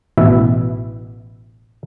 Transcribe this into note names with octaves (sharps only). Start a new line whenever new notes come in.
A1 B2 E4 E5